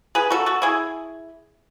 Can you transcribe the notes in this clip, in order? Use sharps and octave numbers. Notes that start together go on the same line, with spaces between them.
G#4 B4
F#4 A4
F#4 A4
E4 G#4